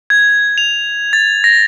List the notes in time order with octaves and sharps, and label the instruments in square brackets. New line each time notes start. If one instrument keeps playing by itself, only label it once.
[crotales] G#6
F7
A6
A#6